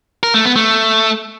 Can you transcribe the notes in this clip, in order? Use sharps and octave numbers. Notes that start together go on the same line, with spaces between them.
A#4
A3
B3
A3